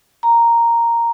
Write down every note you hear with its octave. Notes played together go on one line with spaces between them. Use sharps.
A#5